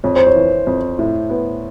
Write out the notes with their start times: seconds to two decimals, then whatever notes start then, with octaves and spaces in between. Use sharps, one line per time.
0.04 F2 C#5
0.16 C5
0.27 C#5
0.35 E3
0.67 F2
0.99 A2
1.30 B3